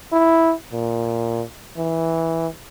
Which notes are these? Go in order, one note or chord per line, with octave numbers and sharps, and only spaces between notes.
E4
A#2
E3